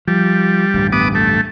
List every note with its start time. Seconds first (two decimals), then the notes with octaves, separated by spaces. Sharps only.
0.07 F3 G3
0.74 A1 D2 G2
0.92 B3 D6 D#6
1.15 A3